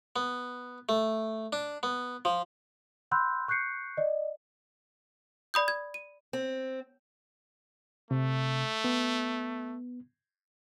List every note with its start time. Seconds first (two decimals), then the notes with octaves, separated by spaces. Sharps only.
0.16 B3
0.89 A3
1.53 D4
1.83 B3
2.25 F3
3.11 F#5 B5 C6 E6 F#6 G6
3.48 C#6 F#6 G6 C7 C#7
3.97 D5 D#5
5.54 D5 B5 D#6 G6
5.68 G#6
5.94 D#7
6.33 C4
8.11 C3 A3
8.84 B3